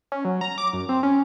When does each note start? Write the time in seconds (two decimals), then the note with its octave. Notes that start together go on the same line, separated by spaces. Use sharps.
0.12 C#4
0.25 F#3
0.41 A#5
0.58 D6
0.73 F#2
0.89 C4
1.03 C#4